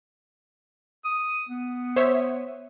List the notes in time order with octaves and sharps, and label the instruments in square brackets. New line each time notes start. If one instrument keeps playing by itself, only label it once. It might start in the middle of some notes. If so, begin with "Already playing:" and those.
[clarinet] D#6
B3
[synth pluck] C5 C#5 E5